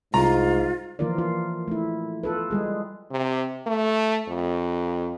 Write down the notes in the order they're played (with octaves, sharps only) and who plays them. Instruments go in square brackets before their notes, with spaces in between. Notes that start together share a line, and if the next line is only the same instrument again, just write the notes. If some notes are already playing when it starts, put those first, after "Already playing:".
[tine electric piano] C2 [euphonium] G#2 [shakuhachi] F4 [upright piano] A#5
[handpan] E3 F3 A#3 F4 A#4 D5
F4
A3 E4
F4 A4 B4
G3 G#3 G#4
[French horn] C3
A3
F2